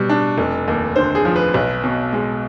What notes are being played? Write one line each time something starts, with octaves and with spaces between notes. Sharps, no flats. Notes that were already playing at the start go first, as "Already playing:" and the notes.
Already playing: B2 G3
D4
F1
D#2
D3 C5
G#4
F3
B4
B1 B4
B2
G#3